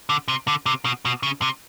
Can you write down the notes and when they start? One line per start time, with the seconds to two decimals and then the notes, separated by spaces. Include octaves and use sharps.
0.09 D3
0.28 C3
0.48 D3
0.66 C3
0.85 B2
1.05 B2
1.23 C#3
1.42 C3